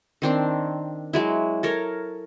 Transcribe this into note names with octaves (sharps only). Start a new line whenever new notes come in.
D#3 C4 D4
F#3 G#3 E4
A4 A#4 C#5